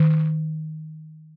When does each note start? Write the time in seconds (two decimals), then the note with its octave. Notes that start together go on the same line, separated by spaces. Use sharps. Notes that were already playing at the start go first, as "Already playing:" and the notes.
Already playing: D#3